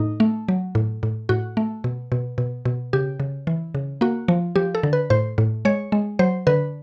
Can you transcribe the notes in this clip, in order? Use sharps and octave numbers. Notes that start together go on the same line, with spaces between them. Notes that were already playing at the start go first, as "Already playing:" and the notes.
Already playing: A2 D#4
A3
F#3
A2
A2
A2 F#4
A3
B2
B2
B2
B2
C#3 G4
C#3
E3
C#3
A#3 F#4
F3
F3 G4
A4
D3
B4
A2 C5
A2
G#3 C#5
G#3
F#3 C5
D3 B4